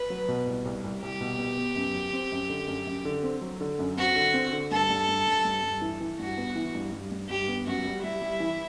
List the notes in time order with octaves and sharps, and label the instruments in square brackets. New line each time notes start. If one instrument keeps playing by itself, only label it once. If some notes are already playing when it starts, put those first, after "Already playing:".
Already playing: [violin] B4
[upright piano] F#3
B2
C2
C2
C2
[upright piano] C2 [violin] G4
[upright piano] B2
B3
B3
F#2
F#3
C4
F#2
D3
F#2
F#2
D3
C4
F#3
D3
F#2
[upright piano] C4 [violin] F#4
[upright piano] D3
C4
D3
[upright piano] G2 [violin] A4
[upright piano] G2
G2
G2
G2
G2
E3
E3
[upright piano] G2 [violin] F#4
[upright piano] B3
E3
G2
G2
G2
[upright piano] G2 [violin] G4
[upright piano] B3
[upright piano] F#2 [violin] F#4
[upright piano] G3
[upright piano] G3 [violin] E4
[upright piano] G3
E3